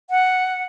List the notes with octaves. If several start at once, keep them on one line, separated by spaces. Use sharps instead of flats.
F#5